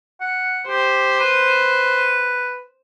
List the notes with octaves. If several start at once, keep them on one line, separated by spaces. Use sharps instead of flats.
F#5
G4 C5
B4